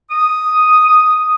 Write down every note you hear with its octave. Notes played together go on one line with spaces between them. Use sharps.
D#6